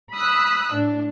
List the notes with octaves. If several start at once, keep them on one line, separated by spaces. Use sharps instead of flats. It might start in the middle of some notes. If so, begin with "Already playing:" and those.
B5 D#6 E6 F#6
A2 D4